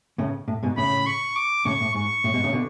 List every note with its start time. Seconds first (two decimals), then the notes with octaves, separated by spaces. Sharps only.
0.18 A2 C#3
0.48 A2
0.63 G#2 B2
0.77 A2 C#3 B5
1.06 C#6
1.36 D6
1.65 A2 C#3 C#6
1.80 A2
1.95 G#2 C#6
2.24 A2
2.33 G#2 B2
2.44 A2 C#3
2.53 B2 D3